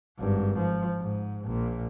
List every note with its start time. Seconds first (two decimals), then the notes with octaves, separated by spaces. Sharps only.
0.19 G#1 G2
0.59 F3
1.00 G#2
1.45 A#1 A#2